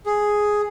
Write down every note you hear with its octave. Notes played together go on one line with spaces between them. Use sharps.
G#4